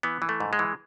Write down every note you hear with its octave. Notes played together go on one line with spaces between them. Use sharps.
E3 B3
E3
A3
G#2
G#3
E3